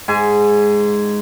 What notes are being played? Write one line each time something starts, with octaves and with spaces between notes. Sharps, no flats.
G#2 G#5